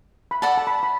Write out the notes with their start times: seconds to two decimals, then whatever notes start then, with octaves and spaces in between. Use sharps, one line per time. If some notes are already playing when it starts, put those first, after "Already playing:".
0.31 B5
0.42 A4 D5 F#5 A5
0.58 A5
0.67 B5
0.83 B5